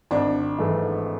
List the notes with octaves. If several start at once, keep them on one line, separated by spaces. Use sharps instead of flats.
G#1 D4
G#2 E3 A3